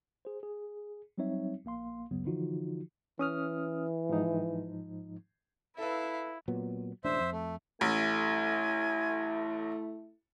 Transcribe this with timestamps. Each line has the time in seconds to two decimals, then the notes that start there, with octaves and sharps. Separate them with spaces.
0.25 G#4 C5
0.43 G#4
1.18 F#3 G3 C4 D#4 C#5 E5
1.65 A#1 A#3 F5 C6
2.11 C#2 F#2 C#3 F#3 B3
2.25 D3 E3 F3 D#4 F4 F#4
3.19 E3 C#4 D#6 F6
4.09 G#2 F3 D#4
5.78 E4 A4 B4 E5 F5
6.48 A#2 F#3 B3
7.04 E1 A1 D4 C5 E5
7.20 F2
7.32 A3
7.81 A1 A3 E4 G#5